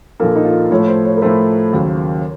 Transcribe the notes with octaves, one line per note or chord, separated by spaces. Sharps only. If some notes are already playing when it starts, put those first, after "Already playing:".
A#1 A#2 F3 A#3 A4
D#4
F4
A2 F3 A3 C#5
C5
C#5
A#4
A2 F3 A3 C5
D#2 C#3 F#3